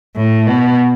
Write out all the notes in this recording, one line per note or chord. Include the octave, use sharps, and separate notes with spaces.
A2
B2